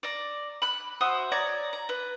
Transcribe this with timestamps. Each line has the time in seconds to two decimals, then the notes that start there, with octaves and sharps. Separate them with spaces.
0.03 D5 A#5
0.62 B5 F#6
1.01 F#4 C5 E5 D#6
1.32 C#5 D5 A#5
1.73 A#5
1.89 B4